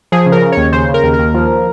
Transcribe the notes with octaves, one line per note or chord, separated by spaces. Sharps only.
F3 G#4
C#3
A#4
C#3
D#2 C#5
C#3 C5
C#3
A#4
D#2
A#4
D#2
F3